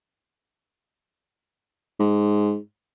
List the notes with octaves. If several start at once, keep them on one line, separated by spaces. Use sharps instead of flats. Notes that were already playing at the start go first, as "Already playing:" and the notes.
G#2